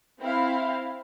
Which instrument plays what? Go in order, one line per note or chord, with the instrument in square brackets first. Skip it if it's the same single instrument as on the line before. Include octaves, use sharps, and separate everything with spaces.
[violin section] C4 E4 F5